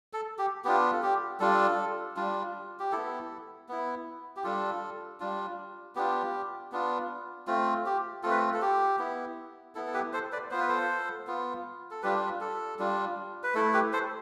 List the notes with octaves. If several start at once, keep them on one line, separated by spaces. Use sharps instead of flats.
A4
G4
B3 D4 F4 G4
A4
G4
G3 D4 F4 A4
G3 D4 F4
G4
B3 E4 A4
B3 E4
G4
G3 D4 F4 A4
G3 D4 F4
B3 D4 F4 G4
B3 D4 F4
A3 C4 F4
G4
A3 C4 F4 A4
B4
A4
A4
G4
B3 E4
B3 E4 A4
A4
G4 B4
A4 C5
B4 D5
B3 F4 C5
B4
A4 C5
B3 F4
A4
G3 D4 F4 G4 B4
A4
G3 D4 F4
B4
A3 E4 A4
G4 B4
A4 C5